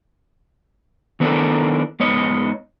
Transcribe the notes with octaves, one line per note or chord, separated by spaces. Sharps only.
D#3 B3 D4 E4 A4 A#4
G#2 B3 C#5 D#5